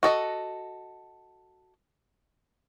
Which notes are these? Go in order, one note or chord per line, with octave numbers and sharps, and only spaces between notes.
F#4 A4 D#5